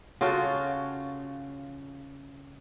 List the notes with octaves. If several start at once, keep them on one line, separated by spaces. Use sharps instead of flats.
C#3 F4 F#4 A4